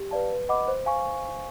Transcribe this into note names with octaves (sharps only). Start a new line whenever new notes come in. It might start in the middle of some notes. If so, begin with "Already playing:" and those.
Already playing: G4
B4 D5 F5 A5
B4
D#5 F#5 B5 D6
C5
F5 G#5 C#6